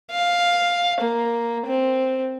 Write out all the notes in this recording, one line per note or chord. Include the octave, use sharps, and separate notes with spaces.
F5
A#3
C4